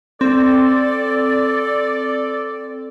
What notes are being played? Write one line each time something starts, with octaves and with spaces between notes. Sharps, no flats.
C4 A4 D5